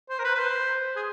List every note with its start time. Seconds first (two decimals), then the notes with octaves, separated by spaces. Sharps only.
0.09 C5
0.19 A#4
0.24 B4
0.35 B4
0.39 C5
0.96 G#4